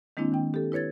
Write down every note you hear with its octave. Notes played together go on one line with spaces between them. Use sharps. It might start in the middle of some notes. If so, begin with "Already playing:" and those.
D#3 G#3 A#3 C4 D4 E4
D#3 G5
G4 A4
E4 B4 C#5 G#6 A6